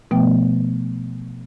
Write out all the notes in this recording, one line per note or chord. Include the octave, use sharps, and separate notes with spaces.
B2 F3 A3 B3 G5